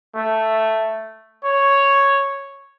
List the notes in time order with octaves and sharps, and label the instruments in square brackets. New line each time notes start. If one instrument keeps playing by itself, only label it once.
[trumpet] A3
C#5